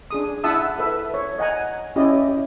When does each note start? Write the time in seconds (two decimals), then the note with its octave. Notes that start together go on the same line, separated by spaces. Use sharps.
0.11 D4 G#4 D#6
0.44 E4 E5 F#5 A5 D#6 E6
0.78 A4 B4 E5
1.14 C#5
1.38 D#5 F#5 G#5 A#5
1.96 C#4 E4 G4 D5 D#5